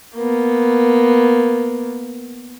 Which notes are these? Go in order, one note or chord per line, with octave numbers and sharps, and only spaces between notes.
A#3 B3